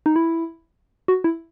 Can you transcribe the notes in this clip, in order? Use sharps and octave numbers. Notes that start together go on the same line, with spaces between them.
D#4
E4
F#4
E4